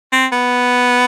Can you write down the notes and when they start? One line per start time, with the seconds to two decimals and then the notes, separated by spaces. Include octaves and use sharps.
0.12 C4
0.32 B3